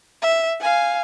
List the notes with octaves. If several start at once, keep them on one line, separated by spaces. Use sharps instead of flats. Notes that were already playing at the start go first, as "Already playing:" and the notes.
E5
F5 G#5